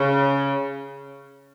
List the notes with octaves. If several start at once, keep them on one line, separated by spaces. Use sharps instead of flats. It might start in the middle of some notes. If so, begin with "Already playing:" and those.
Already playing: C#3